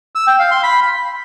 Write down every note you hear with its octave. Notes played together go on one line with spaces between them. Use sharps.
E6
G5
F5
C6
B5